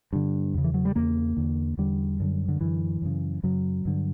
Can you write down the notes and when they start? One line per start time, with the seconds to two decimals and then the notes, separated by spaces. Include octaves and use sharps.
0.13 G2 D3
0.54 E2 C#3
0.64 E3
0.74 F#3
0.85 G3
0.95 E2 C#3 A#3
1.37 E2 D3
1.78 E2 D3 G3
2.20 F#2 D3
2.48 D3
2.61 F#2 D3 E3
3.02 F#2 C#3
3.43 F#2 C#3 F#3
3.85 G2 D3